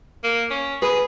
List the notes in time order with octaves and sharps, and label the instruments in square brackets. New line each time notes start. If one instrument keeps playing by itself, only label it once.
[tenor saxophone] A#3
C#4
[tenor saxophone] G#4 [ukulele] B4